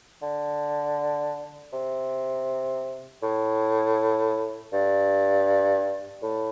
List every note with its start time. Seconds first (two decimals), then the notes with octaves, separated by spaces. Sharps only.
0.22 D3
1.73 C3
3.23 A2
4.73 G2
6.23 A2